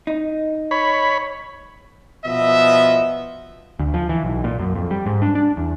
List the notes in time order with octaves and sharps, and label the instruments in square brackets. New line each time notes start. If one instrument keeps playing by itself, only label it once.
[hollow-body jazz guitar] D#4
[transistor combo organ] C#5 B5
[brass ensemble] B2 F3 B3 D#5 E5
[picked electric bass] D2
F3
E3
B1
A#2
F#2
F2
G3
G#2
D4
D4
E2